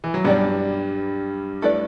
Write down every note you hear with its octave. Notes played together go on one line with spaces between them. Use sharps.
E3
F#3
G2 G3 B3 D4 G4 D5
A3 E4 B4 D5